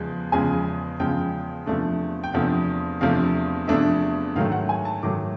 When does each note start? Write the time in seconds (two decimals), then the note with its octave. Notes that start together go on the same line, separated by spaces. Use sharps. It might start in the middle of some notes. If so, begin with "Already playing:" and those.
Already playing: E2 C#3 F3 G#3
0.32 E2 C#3 F3 G#3 G#5
1.00 E2 C#3 F3 G#3 G5
1.66 E2 C3 F3 A3 D4
2.24 G5
2.33 E2 C3 F3 A3 D4 F#5
3.01 E2 C3 F3 A3 D4 F5
3.68 E2 C3 F3 A3 D4 E5
4.35 G#2 D#3 F#3 A3 F5
4.52 F#5
4.69 G#5
4.85 A5
5.03 G#2 D#3 F#3 A3 D6